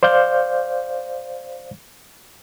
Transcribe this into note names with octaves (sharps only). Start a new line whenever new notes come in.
C5 D5 F5 G6